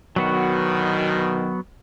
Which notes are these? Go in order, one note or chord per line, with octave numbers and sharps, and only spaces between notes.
D2 B2 D#3 F#3 B3 F#4